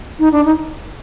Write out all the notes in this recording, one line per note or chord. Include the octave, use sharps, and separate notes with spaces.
D#4
D4
D#4